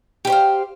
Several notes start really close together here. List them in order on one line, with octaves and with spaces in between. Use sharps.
G4 B4 C5 F5